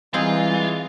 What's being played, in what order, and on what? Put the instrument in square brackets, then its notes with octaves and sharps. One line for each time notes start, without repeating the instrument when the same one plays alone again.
[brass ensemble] E3 G#3 [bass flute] G3 [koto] C4 D#4 G#4 [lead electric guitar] F4